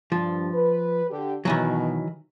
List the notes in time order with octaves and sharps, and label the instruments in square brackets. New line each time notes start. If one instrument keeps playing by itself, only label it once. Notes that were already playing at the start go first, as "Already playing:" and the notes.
[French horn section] G2 [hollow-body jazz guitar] F3
[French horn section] B4
D3 G4
[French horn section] B2 [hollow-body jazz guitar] D#3 E3 F#3